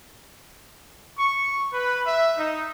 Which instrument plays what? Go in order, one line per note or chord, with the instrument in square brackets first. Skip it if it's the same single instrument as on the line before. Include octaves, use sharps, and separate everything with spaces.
[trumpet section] C#6
B4
E5
D#4